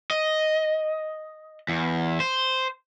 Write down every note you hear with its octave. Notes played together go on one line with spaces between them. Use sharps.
D#5
E2
C5